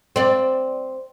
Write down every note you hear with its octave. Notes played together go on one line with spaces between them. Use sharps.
C4 D5